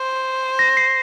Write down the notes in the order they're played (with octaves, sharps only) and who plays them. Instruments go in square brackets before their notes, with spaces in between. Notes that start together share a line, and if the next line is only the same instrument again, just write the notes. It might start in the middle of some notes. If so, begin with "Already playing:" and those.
Already playing: [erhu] C5
[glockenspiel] A#6
C7